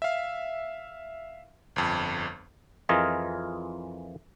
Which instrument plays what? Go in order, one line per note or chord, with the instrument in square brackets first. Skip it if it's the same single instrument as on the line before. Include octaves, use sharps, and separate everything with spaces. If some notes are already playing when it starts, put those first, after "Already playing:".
[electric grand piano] E5 F5
G1 F2
[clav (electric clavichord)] F2 E3 F4 G#4 A#4 D#5